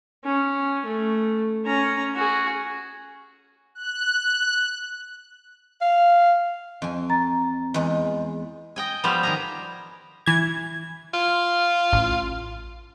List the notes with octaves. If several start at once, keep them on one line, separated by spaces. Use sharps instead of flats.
C#4
A3
C#4 A#5
F#4 G#4
F#6
F5
F2 G#5
A#5 A6
E2 G#3
D#5 G5 G#5
F3 G3 B3 G4 C5 F5
D#3 G#5 A#5
E3 G#6
F4
A1